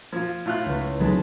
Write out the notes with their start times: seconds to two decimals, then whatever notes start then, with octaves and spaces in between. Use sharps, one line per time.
0.13 F3 F4 G#6
0.46 A2 E4 F4 F#6
0.66 C#2 B4
1.00 D2 F#3 G#3 C4 D#4 B4 A5